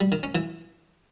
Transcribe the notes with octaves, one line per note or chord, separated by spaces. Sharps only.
G3
D#3
C#4
E3